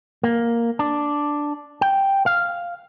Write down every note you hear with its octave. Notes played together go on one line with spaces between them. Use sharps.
A#3
D4
G5
F5